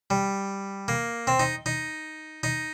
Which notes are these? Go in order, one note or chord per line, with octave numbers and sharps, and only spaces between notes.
G3
A#3
C4
D#4
D#4
D#4